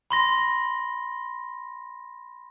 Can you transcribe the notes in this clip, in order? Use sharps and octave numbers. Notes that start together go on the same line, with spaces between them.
B5 C6 A#6